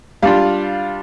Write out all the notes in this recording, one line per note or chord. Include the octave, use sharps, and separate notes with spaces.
G3 D4 F4 F5